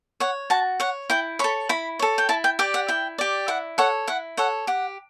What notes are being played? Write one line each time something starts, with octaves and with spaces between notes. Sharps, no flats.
C#5 F#5
F#4 A5
C#5 F#5
E4 G5
A4 C#5 B5
E4 B5
A4 C#5
G5
E4 A5
G5
G4 D5 G5
F#5
E4 G5
G4 D5
E4 F#5
A4 C#5 F#5
E4 F#5
A4 C#5 F#5
G4 F#5